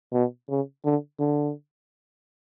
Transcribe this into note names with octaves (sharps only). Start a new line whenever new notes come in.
B2
C#3
D3
D3